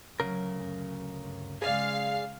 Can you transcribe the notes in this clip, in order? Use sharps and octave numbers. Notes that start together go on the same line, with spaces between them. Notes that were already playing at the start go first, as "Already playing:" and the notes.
D2 C#3 F#3 A#4
F#2
G2
C#3 G#3 G#4 D5 F5